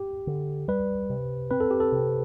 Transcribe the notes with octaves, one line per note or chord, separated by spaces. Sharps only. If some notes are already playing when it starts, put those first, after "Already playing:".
Already playing: G4
D3
G3 B4
C3
C4 B4
A4
G4
A4
C3